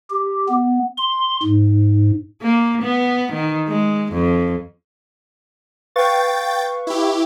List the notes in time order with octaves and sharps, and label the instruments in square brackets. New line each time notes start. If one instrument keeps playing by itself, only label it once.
[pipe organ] G4
B3
C6
G#2
[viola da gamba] A#3
B3
D#3
G#3
F2
[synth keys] B4 F5 C#6 [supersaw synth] G5 A6
[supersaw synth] E4 G4